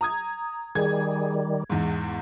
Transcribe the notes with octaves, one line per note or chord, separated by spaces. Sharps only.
A#5 D#6 G#6
D#3 G3 G#4 G#6
E2 G#2